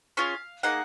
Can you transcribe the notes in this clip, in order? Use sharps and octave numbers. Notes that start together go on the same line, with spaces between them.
C#4 F4 G#4 F5
A#3 D#4 G#4 F#5